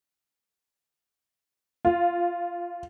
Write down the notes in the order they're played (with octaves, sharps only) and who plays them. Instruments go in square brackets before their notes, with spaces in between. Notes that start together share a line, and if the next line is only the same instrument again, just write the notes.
[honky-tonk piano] F4